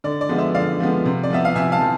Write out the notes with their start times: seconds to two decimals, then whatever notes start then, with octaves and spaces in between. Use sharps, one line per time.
0.04 D3 D5
0.21 D5
0.29 F3 G#3 B3
0.38 E5
0.54 D3 D5 F5
0.80 F3 G#3 B3
1.05 C3
1.24 D5
1.30 F3 B3 E5
1.45 F5
1.55 C3 E5 G#5
1.72 F5 A5
1.81 F3